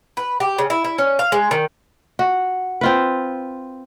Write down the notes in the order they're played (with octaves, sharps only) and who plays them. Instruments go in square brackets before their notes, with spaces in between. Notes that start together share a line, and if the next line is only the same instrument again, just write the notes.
[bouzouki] B4
G4
C#3
E4
E4
C#4
F5
G#3
D#3
[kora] F#4
C4 F4 B4